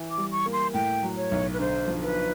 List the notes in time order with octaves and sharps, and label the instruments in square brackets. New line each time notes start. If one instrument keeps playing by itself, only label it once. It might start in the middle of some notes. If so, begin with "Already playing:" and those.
Already playing: [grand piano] E3
[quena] D6
[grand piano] G3
[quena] C#6
[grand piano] A#3
[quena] C6
[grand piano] A2 [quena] G5
[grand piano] F#3
[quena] C#5
[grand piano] B1
[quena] B4
[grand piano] D3 [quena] C5
[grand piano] F3
[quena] B4